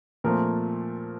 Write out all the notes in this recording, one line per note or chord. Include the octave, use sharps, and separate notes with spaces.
A#2 F3 A3 C4 A#4